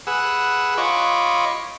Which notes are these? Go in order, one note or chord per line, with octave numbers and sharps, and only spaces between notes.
G#4 B4 F#5 E6
F4 C#5 D#5 B5 C#6 D6